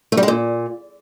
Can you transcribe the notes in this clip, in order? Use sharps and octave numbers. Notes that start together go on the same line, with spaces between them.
A3
G3
G#3
A#2